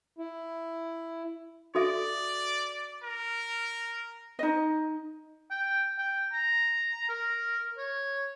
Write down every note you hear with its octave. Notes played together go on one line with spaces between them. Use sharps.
E4
F#4 A4 D5 E5
A#4
D#4 D#5
G5
G5
A#5
A#4
C#5